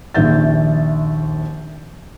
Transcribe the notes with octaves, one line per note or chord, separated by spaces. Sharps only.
A#1 D#2 E5 G6 A6